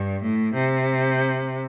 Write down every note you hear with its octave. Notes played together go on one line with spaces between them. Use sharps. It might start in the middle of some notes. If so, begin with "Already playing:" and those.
Already playing: G2
A2
C3